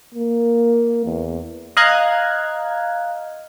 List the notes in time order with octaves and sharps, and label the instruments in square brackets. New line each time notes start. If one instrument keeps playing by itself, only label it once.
[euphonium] A#3
E2
[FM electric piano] D#5 F5 A#5 F6 F#6 G#6